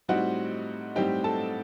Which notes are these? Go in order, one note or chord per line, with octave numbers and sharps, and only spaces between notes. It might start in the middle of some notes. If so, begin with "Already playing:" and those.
A2 G3 C4 D#4 F#4 F#5
A2 G3 C4 D#4 G4 G5
A4 A5